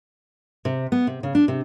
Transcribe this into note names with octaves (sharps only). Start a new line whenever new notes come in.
C3
B3
C3
C#3
D4
C3